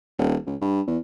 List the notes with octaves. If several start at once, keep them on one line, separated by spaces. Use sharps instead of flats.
D#1
C#2
G2
E2